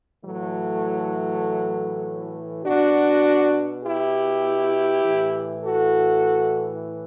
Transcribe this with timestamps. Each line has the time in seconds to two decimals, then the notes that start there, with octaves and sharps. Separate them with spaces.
0.25 A2 E3 F#3 A3
2.64 B2 D4 F#4
3.84 E4 G4
5.04 A2 E3
5.64 F#4 A4